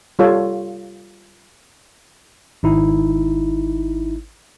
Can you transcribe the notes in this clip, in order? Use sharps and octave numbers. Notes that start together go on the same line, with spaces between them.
G3 F4 A4 C#5
G#1 D#4 E4